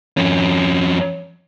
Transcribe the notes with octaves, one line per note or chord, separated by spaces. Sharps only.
F2 C#4